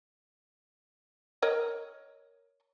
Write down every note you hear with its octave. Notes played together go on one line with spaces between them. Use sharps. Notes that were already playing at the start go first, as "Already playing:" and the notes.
A#4 C#5 D#5